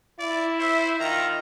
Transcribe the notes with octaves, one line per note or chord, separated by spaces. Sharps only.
E4 D5
C5 E5
D#3 F4 A#5